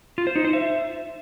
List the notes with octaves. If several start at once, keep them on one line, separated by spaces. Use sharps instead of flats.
F4
C5
D#4
C5
E5